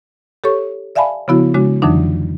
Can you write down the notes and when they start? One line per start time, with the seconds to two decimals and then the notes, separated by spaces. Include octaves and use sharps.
0.44 G4 A4 C#5 C#6
0.96 D5 E5 F5 G#5 A5 B5
1.28 C#3 F3 B3 E4 F#4
1.54 C#3 G#3 D4 F#4
1.82 F2 D3 E3 F#3 D4 D#4